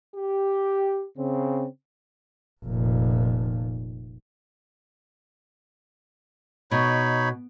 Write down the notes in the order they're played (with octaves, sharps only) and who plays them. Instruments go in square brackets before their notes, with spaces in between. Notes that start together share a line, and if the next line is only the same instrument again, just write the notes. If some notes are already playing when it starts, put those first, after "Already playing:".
[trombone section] G4
C#3 C4
[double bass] F1 A#2
[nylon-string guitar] B2 [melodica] D#4 C#5 B5